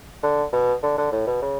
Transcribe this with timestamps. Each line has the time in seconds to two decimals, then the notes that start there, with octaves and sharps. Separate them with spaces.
0.23 D3
0.53 B2
0.83 D3
0.98 D3
1.12 A2
1.27 B2
1.42 C#3